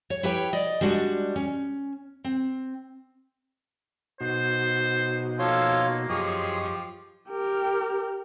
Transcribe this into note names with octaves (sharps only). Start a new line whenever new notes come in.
C#5
E4 G4 B4 C#5 G5
D5 D#5
G3 G#3 D4 F#4
C#4
C4
B2 D#4 F#4 C5
F3 A#3 A4 C#5 F5 C6
F#2 F3 G4 G#4 C#5 D#5 C6
F3
G4 A#4